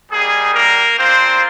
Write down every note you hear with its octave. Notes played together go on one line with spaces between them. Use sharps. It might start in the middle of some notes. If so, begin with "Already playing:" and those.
G3 A#3 D#4 G#4
A#3 A#4
A#3 C4 D4 F4 C5